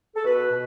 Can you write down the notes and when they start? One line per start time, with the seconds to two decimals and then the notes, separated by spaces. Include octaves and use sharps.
0.16 A4
0.25 B2 F#4 B4
0.51 B2